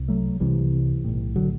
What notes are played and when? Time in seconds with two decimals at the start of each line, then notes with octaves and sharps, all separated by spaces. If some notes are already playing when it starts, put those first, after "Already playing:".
Already playing: C2
0.08 F#3 A3
0.40 C2 C3 E3 G3
1.05 B1 A2
1.36 D3 F#3